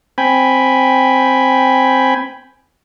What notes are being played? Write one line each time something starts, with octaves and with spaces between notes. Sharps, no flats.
C4 G5 G#5 B5